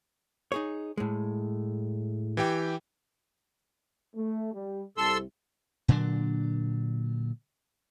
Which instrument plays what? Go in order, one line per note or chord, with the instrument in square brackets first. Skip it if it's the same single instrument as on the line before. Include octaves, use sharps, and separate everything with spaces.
[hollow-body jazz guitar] D#4 G#4 C#5
A2 G#3
[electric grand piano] E3 G4 G5
[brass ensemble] A3
G3
[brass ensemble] C2 C3 [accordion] A4 C6 E6
[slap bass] A#2 D3 F#3 D4